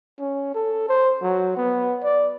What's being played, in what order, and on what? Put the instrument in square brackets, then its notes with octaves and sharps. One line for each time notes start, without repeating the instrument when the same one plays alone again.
[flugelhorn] C#4
A4
C5
F#3
B3
D5